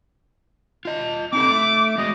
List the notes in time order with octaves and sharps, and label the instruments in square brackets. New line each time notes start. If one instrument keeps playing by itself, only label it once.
[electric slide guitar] F4 D#5
[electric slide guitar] C4 D#4 A4 [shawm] D6
[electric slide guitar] A3
[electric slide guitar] G#3 F#4 G#4 [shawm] D#5